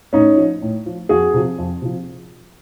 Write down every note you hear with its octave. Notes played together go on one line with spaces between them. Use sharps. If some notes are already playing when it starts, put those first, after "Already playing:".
A2 C#4 D#4
F3
A2
F3
F2 F#4 G#4
C3 F3
F2
C3 F3